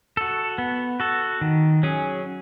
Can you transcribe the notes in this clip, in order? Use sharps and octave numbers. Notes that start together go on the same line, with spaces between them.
F#4 A4
B3
F#4 A4
D#3
F#3 C#4 G#4